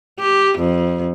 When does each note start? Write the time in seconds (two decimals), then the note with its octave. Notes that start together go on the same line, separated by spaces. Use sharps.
0.19 G4
0.58 F2